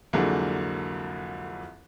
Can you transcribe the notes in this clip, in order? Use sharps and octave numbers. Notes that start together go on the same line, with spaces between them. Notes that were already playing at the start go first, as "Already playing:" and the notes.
C2 F2 D3 F#3 G#3 A#3